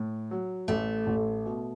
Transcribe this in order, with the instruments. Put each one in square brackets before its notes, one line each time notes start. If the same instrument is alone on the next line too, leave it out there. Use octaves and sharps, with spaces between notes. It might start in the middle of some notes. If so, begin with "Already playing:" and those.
Already playing: [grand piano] A2
F#3
[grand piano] A1 [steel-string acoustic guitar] A3
[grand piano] A1
B2